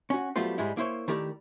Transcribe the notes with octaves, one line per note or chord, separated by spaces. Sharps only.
C#4 F#4
F#3 G3 A3 B3 F4 C5
G#2 G3 G#3 E4
A#3 E4 C5 C#5
D#3 A3 E4 G4 A#4 D5